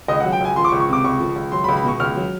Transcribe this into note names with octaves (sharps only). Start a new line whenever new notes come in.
C#2 D#5
F#5
F#3
G5
C#2 G#5
F3 C6
D6
C#6
C#2
C#6
C3 D6
C#2 C#6
F3
C#2
F#3 C6
B5
C#2
B5
B2 C#6
C#2 F6
F#3